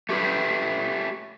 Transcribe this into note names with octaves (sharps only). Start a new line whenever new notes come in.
A3 G4 B4